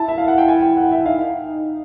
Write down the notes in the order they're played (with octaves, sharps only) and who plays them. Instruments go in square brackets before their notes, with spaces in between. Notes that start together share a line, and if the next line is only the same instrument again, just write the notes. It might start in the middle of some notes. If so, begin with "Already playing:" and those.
Already playing: [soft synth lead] E4 [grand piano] A5
[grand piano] E5
F5
F#5
G5
G#5
G5
F#5
E5
[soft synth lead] D#4 [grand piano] F5